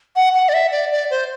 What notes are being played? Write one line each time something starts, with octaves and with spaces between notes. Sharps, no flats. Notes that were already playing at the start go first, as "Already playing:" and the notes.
F#5
F#5
D5
E5
D5
D5
C5